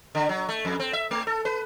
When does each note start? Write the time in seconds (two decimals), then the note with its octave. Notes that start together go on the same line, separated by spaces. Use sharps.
0.15 D3
0.29 F#3
0.49 A3
0.65 F2
0.80 C4
0.93 E5
1.11 A3
1.27 A4
1.45 B4